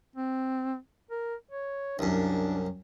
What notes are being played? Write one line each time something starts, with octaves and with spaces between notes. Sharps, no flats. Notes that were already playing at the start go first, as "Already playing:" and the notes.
C4
A#4
C#5
C2 F#2 D4